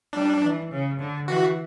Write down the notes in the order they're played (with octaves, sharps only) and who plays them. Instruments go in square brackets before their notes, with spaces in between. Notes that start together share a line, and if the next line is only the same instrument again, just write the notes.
[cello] G3 [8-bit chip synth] D4
[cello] E3
C#3
D3
[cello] E3 [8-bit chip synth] F#4